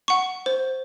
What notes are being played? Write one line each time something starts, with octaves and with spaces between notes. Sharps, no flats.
F#5 C#6
C5